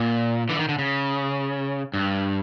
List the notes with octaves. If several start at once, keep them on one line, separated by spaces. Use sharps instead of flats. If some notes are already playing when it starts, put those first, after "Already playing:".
Already playing: A#2
D3 E3
D#3
D3
C#3
G2